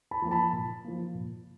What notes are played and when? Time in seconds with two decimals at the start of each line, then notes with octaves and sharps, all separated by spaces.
0.11 A5 B5
0.22 F3 A#3
0.31 A5 B5
0.53 A#2
0.84 F3 A#3
1.15 A#2